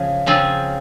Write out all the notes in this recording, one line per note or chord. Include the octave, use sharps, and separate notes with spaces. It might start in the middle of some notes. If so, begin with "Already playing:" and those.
Already playing: C#3 F3 G#4 F5
C#3 F3 C4 F4 G#4